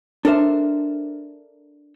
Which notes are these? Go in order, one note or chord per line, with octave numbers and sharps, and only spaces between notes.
D4 A4 A#4 C5 E5